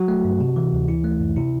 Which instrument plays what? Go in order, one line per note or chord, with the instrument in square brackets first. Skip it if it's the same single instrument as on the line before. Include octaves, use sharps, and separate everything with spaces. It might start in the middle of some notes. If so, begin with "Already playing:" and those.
Already playing: [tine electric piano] F#3 F#4
A3
G2
C3
E3
D2
E3 E4
A3
F#2
C3 E4